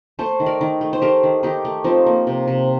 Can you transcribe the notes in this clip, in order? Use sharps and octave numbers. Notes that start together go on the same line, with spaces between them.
A3 A4 C5
D#3
A#4 D5
D#3
A3
C5
A3 G4 A#4
D#3
D#3 D#4 G4
A3
F3 C4 D#4
A#3
C3
C3